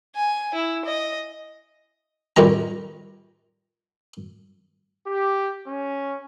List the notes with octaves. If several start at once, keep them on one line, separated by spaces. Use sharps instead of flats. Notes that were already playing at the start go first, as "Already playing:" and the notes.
G#5
E4
D#5
A1 F2 D#3 G3 A#5
G4
C#4